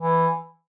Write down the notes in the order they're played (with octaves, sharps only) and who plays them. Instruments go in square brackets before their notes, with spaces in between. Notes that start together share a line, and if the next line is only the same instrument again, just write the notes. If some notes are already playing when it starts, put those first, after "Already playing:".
[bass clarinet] E3